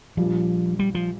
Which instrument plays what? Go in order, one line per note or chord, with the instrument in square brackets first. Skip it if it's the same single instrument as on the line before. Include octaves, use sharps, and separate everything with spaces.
[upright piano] A#1 A#2 G3 [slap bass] F3
[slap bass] G3
F3